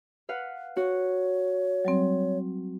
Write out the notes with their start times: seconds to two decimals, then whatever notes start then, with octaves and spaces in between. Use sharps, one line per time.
0.29 B4 F5 F#5
0.77 F#4 C#5
1.85 F#3 G3 C4